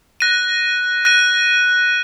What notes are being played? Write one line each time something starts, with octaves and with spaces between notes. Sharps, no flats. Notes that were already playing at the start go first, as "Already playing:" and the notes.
F#6 A#6 D#7
F#6 A#6 D#7